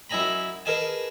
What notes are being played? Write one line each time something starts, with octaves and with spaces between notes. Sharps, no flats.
F#2 E4 D#5 G#5 A#5 B5
G#4 A#4 B4 D#5 G#5 A5